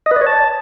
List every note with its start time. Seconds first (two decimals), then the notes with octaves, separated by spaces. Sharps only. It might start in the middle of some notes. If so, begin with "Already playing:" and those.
0.06 D#5
0.11 B4
0.16 D5
0.21 C#5
0.27 A5